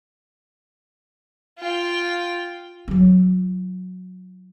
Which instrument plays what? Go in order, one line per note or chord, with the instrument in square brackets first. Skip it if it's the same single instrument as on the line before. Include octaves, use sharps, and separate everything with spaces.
[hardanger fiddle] F4 G5
[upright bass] F#3 F4